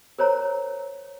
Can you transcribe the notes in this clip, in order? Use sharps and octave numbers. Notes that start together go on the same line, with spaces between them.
A#4 C5 C#5 A#5